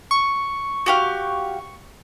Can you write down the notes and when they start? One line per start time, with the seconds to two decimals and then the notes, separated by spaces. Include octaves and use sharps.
0.11 C#6
0.86 F#4 G4 F5